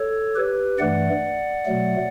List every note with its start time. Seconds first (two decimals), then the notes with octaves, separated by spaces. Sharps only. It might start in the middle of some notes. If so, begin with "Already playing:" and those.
Already playing: A4 C#5
0.35 G4 B4
0.79 G2 E3 A3 D5 F#5
1.66 B2 F#3 A3